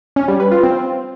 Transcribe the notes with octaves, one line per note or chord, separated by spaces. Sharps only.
C#4
G3
B4
F4
C4